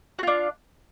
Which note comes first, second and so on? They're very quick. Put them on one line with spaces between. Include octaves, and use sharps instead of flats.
F#4 F4 D4